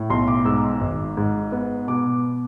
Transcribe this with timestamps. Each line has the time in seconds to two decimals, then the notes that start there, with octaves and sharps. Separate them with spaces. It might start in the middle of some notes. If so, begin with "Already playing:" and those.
Already playing: A2
0.10 B1 C6
0.28 D6
0.45 G#2 E6
0.81 G#1
1.17 G#2
1.52 B3
1.88 B2 D6